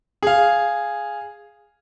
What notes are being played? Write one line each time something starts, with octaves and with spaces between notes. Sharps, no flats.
G#4 F5